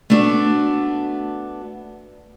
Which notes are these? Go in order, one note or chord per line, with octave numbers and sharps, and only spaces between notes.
A3 B3 D4 F#4